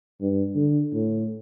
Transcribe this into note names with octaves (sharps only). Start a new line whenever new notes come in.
G2
D3
A2